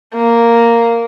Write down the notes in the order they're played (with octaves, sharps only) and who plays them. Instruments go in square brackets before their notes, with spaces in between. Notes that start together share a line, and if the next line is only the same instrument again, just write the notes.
[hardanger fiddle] A#3